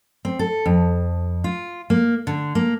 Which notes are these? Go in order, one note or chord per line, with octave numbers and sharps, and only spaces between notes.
C4
A4
F2
F4
A#3
D3
A#3